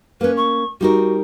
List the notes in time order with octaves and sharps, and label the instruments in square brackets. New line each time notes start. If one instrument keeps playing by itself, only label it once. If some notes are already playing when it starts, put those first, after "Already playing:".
[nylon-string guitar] A#3 C#4 [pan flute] B4
[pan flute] C#6
[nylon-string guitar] G3 D#4 A#4 [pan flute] F#4